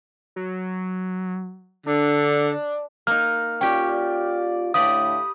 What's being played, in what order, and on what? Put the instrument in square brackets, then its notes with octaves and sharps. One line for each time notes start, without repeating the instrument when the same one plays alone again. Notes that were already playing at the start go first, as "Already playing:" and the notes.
[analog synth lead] F#3
[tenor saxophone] D3 [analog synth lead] D4
[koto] A#3 D#4 [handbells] F6
[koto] C#4 G4 [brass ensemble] F4 D5 [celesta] G5
[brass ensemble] A2 D3 [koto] G4 B4 D5 [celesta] F5 [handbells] D#6